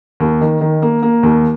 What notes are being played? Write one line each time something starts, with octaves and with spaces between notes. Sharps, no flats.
D#2
D#3
D#3
A#3
A#3
D#2